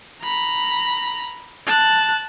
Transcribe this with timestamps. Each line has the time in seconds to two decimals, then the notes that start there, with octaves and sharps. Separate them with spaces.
0.22 A#5 B5
1.67 A5 F#6